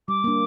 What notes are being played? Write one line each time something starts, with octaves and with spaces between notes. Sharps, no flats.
G3 D6
A#3 D4